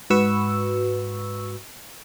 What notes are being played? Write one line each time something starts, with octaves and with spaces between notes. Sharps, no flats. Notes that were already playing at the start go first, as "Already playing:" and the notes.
G#2 F#4 B4 C#6 E6